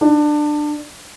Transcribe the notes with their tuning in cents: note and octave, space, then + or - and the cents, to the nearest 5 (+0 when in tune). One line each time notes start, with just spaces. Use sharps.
D4 +20